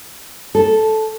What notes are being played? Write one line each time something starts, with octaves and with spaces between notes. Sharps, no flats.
A4